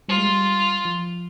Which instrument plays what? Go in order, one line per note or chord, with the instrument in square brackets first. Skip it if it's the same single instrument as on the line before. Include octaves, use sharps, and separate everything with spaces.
[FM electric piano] G3 [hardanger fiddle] F4
[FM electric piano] G#3
G3
F3